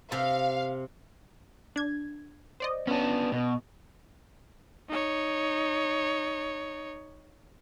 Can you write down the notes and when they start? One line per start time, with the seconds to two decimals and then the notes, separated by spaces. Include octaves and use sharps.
0.12 C3 F5
1.76 D4 G#6
2.60 C5 D5 D#5
2.87 B3 C#4 D4
3.32 B2
4.89 D#4 C#5